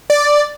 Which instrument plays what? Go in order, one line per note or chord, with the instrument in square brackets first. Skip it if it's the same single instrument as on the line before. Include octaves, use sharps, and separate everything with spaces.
[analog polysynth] D5